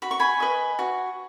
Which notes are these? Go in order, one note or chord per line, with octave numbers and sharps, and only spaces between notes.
F#4 B5
C#6
G#5 B5
B4 D#5
F#4